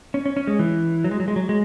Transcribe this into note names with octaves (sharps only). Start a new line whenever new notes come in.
C#4
C#4
C#4
G#3
E3
F#3
G#3
F#3
G#3
F#3
G#3